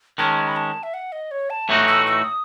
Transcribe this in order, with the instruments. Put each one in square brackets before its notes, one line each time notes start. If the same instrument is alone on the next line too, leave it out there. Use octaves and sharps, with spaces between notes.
[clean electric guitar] D#3 G#3 C#4 [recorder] A5
[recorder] B5
A5
E5
F#5
D#5
C#5
A5
[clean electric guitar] A2 E3 A3 D#4 F#4
[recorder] E6
E6
D#6